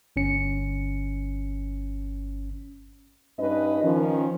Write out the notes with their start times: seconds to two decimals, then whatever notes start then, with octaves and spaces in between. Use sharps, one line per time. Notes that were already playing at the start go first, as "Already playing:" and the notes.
0.16 G1 C#4 C#7
3.39 G2 C#4 D#4 B4 D#5
3.82 D#3 F3 C#4